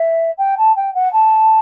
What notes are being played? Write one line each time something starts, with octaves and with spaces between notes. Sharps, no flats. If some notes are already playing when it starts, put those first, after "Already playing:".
Already playing: E5
G5
A5
G5
F#5
A5